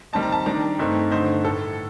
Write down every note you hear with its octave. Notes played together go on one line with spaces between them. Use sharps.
D#3 G3 C4 D#4 A5
A#5
A5
D#3 G3 D4 A#5
G2 D#3 A3 C4 D#4
G2 D3 A3 D#4 C5
A2 A4